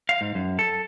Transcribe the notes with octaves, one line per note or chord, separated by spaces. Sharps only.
F5
G#2
F#2
A4